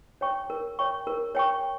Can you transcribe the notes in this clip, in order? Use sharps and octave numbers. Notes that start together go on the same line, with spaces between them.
C#5 G5 C#6
A#4
C#5 G5 C#6
A#4
C#5 G5 C#6